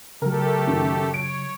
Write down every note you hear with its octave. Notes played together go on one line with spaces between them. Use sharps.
C#3 F#3 A3 G4 A4 A#4
F#2 D#3
C#5 D7